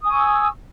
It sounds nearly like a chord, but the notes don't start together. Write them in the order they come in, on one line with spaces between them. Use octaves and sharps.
D#6 G#5 C#6 E6